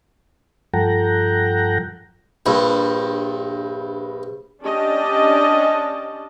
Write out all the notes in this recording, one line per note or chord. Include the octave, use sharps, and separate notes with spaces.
G2 F3 A4 F#5 G5 A#5
A#1 G2
C#4 D4 G4 D5 D#5 A5